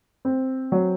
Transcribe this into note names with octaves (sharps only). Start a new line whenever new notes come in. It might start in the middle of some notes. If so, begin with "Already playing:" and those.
C4
F#3